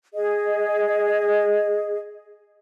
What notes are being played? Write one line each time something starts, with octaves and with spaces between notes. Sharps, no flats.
G#4 D#5